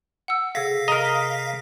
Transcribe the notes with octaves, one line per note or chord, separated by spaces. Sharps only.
F#5 E6
C3 G#4 A4 F5 A#6 B6
A#4 D#5 A#5